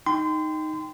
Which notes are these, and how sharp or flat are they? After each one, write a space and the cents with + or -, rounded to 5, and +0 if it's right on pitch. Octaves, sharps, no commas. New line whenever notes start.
D#4 +0 G5 +5 C6 -30